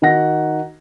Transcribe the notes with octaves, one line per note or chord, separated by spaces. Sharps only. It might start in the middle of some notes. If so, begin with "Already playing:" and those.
D#3 D#4 F#4 F#5 A#6